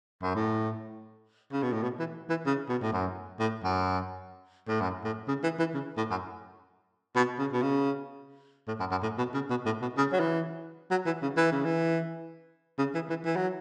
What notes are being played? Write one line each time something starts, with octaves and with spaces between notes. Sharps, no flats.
F#2
A2
C#3
B2
A2
B2
E3
E3
C#3
B2
A2
F#2
A2
F#2
A2
F#2
A2
C#3
E3
E3
C#3
A2
F#2
B2
C#3
B2
C#3
A2
F#2
F#2
A2
B2
C#3
B2
A2
B2
C#3
F#3
E3
F#3
E3
C#3
E3
C#3
E3
C#3
E3
E3
E3
F#3